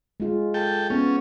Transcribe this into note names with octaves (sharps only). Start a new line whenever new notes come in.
G#3 F4
A4 G5
B3 C#4